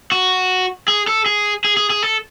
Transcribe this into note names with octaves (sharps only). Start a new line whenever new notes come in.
F#4
G#4
A4
G#4
G#4
G#4
G#4
A4